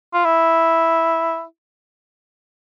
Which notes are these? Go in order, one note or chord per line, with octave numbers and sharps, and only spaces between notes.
F4
E4